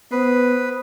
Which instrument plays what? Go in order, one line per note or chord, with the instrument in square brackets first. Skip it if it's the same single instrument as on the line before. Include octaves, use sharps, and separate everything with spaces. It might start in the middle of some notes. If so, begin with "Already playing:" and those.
[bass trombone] B3 [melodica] B4 [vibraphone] C5 D#6